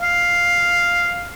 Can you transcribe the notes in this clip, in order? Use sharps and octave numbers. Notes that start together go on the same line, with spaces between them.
F5